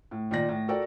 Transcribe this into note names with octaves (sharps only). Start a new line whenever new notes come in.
A2
A#2 D#3 D5 A#6
A2
F#4 A4 A#4 D5 G5